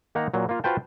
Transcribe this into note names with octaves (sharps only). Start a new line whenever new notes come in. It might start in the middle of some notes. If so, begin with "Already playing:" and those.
D#3 A#3 D#4 F#5 A#5
A#2 F#3
A#3 F4
F4 F#4 B4 C5 G5 A5